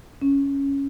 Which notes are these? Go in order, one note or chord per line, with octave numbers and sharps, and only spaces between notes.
C#4